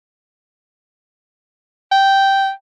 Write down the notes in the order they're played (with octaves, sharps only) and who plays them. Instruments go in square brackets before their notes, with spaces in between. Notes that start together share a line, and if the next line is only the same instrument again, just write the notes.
[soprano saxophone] G5